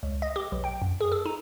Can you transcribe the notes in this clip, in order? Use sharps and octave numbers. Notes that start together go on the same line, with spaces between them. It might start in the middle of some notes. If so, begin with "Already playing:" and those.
C#2
D#5
G4
B1
G5
F#2
G#4
A4
D#4